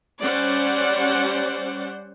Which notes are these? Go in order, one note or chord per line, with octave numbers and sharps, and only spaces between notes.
G3 C#4 C5 D5 F#5